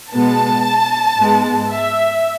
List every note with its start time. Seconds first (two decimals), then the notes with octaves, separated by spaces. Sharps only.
0.13 B2 G#3 B3 A5
1.19 G#2 G#3 B3
1.71 E5